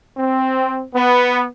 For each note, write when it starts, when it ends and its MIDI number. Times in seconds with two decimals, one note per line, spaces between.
0.17 0.82 60
0.94 1.43 59